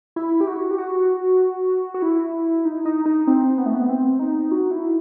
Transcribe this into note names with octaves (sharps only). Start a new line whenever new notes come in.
E4
G4
F#4
G4
F#4
F#4
E4
D#4
D#4
D#4
C4
B3
A3
B3
C4
D#4
F#4
E4